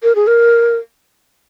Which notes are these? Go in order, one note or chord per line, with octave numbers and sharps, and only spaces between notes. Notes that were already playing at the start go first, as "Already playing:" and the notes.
A#4
G#4
A#4